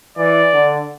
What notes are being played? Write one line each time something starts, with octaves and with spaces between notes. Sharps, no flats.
E3 D5
D3